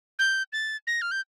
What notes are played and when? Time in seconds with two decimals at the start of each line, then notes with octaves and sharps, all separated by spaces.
0.19 G6
0.53 A6
0.87 A#6
1.02 F6
1.11 G6